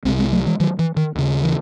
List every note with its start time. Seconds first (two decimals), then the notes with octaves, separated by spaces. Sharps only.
0.05 C2 G#3 C4
0.08 C3
0.19 G#3 C4
0.32 F#3 A3
0.46 E3 G#3
0.60 D#3 F#3
0.79 E3
0.97 D#3
1.15 D#2 C#3
1.44 E3